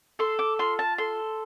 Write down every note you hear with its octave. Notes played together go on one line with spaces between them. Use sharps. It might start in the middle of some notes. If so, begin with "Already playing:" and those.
A4 C6
D6
F4 C6
A5
A4 C6